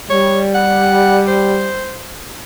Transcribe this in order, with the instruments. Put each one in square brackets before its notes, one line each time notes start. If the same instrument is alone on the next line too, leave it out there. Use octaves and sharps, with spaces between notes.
[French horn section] G3 [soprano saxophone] C#5
[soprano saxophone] F#5
C5